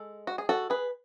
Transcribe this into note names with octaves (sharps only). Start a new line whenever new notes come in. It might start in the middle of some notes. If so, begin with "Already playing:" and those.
Already playing: G#3 A4
F#4
G#4
F#4 A4
G#4 B4